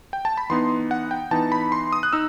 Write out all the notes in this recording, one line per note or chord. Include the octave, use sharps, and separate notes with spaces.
G5
A5
B5
E3 B3 D#4 C6
F#5
G5
E3 B3 D#4 A5
B5
C6
D#6
F#6
D#4 E6